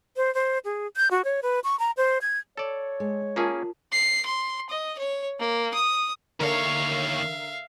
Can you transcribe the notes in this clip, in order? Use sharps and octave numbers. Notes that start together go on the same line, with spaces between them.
C5
C5
G#4
G6
F#4
C#5
B4
C#6
A#5
C5
G#6
A4 C#5 D5
G#3
A#3 C#4 F4 G#4 A#4 A5
C7
C6
D#5
C#5
A#3
D#6
D#2 D3 A#4 C#5 E5 F5